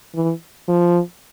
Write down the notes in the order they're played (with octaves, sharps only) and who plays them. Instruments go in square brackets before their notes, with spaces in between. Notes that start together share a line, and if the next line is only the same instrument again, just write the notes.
[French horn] E3
F3